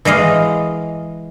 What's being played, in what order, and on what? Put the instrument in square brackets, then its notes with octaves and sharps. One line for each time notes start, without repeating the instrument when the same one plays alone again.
[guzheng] E3 G#3 D#5 F5